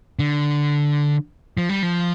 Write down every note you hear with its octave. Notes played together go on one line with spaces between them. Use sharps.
D3
F3
G3
F3